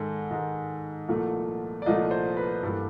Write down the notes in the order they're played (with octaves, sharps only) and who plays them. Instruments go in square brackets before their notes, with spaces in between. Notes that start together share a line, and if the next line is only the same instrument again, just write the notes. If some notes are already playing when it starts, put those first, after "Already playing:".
Already playing: [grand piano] G#2 D#3 G#3 A4
G#2 D#3 G#3
C2 A#2 F3 A3
D5
C2 A#2 F3 A3 D#5
C5
B4
G2 E3 G3 A#3 A4